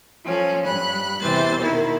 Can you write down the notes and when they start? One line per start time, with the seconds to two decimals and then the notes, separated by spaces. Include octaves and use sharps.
0.24 F3 C#4 A4
0.65 G2 B5 F#6
1.21 E2 C3 E3 C5 A6
1.56 B2 D#3 E4